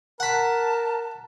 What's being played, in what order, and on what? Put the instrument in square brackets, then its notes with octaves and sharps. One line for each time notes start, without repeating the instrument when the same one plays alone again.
[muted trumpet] A#4 [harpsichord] F#5 B5 [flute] A5